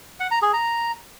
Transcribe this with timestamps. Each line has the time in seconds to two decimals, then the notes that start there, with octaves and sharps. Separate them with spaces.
0.20 F#5
0.31 A#5
0.42 G#4
0.53 A#5